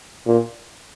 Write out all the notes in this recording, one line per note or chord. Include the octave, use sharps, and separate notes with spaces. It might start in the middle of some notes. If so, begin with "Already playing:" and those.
A#2